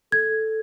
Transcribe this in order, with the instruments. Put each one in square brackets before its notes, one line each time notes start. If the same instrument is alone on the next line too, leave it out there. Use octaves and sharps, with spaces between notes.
[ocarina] A4 [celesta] G#6